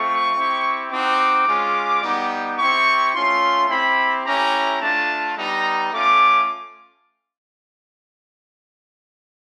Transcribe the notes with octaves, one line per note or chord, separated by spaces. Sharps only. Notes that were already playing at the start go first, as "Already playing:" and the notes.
Already playing: A3 C4 F4 C#6
C4 E4 G4
C4 D#4 F#4 D6
G#3 C#4 F4
G3 B3 D#4 G4
C4 E4 G4 C#6
A3 C#4 F4 C6
C4 E4 G4 B5
A3 C#4 E4 G4 A#5
A3 D4 F4 A5
G3 B3 D#4 A#5
A3 C#4 F4 D6